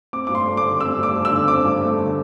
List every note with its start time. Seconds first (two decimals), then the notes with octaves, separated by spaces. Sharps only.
0.13 C4 D6
0.27 G2 D6
0.35 C6
0.46 A3
0.57 D6
0.64 D3
0.79 C4 E6
0.96 G2
1.03 D6
1.13 A3
1.25 E6
1.31 D3
1.48 C4 D6
1.65 G2
1.81 A3
1.98 D3